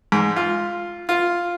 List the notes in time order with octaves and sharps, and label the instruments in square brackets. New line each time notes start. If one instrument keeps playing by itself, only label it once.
[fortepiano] G#2
F4
F4